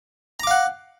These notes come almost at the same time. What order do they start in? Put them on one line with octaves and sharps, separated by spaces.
A#5 D6 F5 F#5